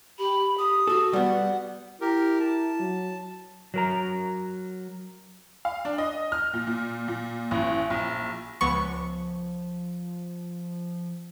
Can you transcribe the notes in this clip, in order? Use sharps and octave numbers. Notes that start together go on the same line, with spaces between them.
G4 B5
G4 D#6
F#4 A4
G3 B3 F#5
E4 G4 A#4
A5
F#3
F#3 A#4 A#5
F5
D4
D#5
F6
A#2
A#2
A#2
A1
A#1
C#2 F3 B3 C#6